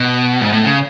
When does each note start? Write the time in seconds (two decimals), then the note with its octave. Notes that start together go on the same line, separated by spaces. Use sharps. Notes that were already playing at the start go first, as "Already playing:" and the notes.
Already playing: B2
0.41 G#2
0.52 A2
0.65 C#3